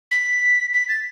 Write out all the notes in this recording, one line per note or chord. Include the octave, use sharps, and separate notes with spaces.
B6
B6
A6